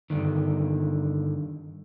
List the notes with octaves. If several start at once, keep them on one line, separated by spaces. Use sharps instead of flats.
G2 D3 D#3